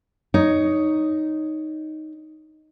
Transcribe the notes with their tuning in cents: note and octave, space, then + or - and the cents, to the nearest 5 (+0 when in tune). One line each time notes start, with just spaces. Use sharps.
D#4 +0 C#5 +10